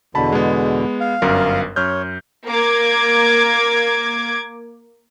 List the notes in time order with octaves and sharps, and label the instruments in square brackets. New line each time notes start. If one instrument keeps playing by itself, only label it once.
[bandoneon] E2 B2 D3 [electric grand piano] A5 B5
[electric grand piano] G#3 B3
[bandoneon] F5
[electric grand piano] G1 F#2 A#4
[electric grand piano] F#2 F6 G6 [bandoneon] C#5
[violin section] A#3 D6 G#6